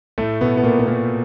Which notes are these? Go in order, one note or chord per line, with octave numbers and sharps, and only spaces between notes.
A2 A3
B2 B3
B3
A#2 A#3
B3
A#2 A#3